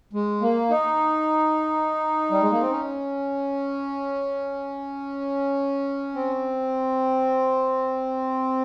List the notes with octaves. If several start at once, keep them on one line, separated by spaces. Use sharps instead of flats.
G#3
A#3
D#4
G3
G#3
A#3
C4
C#4
C4